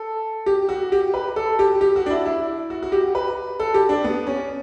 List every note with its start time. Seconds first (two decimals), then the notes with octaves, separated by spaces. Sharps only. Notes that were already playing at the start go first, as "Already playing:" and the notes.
Already playing: A4
0.46 G4
0.69 F#4
0.92 G4
1.14 B4
1.36 A4
1.59 G4
1.81 G4
1.96 F#4
2.06 D4
2.11 E4
2.26 E4
2.70 F#4
2.83 F#4
2.92 G4
3.15 B4
3.60 A4
3.74 G4
3.89 D4
4.04 B3
4.27 C#4